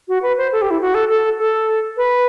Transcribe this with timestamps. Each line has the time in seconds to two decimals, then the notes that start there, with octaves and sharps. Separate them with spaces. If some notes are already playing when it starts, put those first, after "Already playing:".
0.08 F#4
0.23 B4
0.38 C5
0.52 A4
0.62 G4
0.71 E4
0.81 F#4
0.95 A4
1.09 A4
1.39 A4
1.97 B4